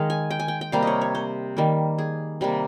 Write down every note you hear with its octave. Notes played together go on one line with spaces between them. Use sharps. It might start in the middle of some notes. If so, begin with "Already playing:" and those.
Already playing: D#3 G#3 F5
G#5
G5
G#5
G5
G5
C3 G3 A#3 F5
C#5 D#5
C#5
C5
D#3 G3 A#3
G#4
C3 G3 A#3